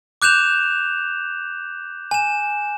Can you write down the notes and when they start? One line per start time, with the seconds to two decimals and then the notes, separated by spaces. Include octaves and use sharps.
0.22 D6 F#6 G6 E7 F7
2.11 G#5 E7